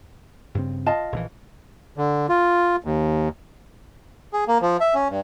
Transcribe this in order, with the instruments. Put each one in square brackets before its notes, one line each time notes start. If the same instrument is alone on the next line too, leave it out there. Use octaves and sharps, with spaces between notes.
[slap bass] G2 C#3 C4
[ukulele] F4 D#5 A5
[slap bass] A#1 C#3 E3
[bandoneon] D3
F4
D#2
G#4
A#3
F3
E5
C#4
G2